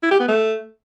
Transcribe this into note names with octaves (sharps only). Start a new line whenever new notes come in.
E4
G4
B3
A3